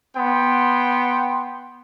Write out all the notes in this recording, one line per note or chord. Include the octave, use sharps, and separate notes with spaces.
B3 G5 C6